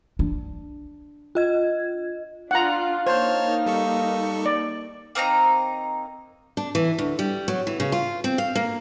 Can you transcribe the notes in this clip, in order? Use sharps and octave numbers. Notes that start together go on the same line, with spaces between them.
D4
F4 D#5 G#6
D4 F4 F5 F#5 A#5
A#3 D#4 C5 C#5 A5 F6
G3 A4 C#6
D5
A#3 C4 D#4 A#5
D4
E3
D2
G3
F#3
E3
C#3
F4
C4
F5
A#3